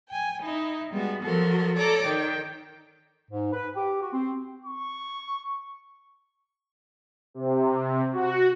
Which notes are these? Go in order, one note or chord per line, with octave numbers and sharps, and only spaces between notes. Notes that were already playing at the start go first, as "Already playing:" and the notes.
G5 G#5
D#4 E4
G3 G#3 B3 F#4
F3 F#3 F#4 A4 A#4
A4 C#5 D5 A#5 D6
D#3 G5
G#2
B4
G4
F#4
C4
C#6
C3
F#4